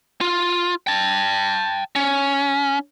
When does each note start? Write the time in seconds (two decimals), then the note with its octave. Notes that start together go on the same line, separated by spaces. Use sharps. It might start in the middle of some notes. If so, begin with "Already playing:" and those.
0.21 F4
0.87 G5 A5
1.96 C#4